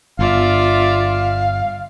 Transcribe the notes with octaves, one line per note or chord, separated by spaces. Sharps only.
G1 F4 D5 E5 F5